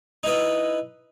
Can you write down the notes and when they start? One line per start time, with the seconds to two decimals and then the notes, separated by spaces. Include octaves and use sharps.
0.23 D#4 E4 B4 D#5